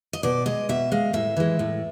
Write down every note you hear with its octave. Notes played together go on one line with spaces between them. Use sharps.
D#5
B2 D5
G#3 D#5
B2 E5
G#3 F5
A2 E5
E3 G#3
A2